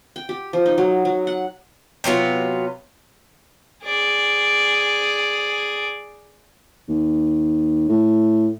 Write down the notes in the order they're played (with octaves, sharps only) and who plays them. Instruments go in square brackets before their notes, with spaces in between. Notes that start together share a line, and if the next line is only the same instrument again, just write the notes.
[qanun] G5
G4
F3
D#4
F#3
F#3
F#5
[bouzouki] C3 F#3 B3 F4
[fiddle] G#4 D5
[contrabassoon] D#2
A2